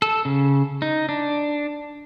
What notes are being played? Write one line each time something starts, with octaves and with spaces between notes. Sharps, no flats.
A4
C#3
D#4
D4